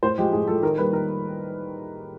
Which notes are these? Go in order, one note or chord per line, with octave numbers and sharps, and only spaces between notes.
A2 C5
F3 G#3 G4
A2 G#4
F3 G#3 A4
D#3 A#4
G3 A#3 B4
D#3 A#4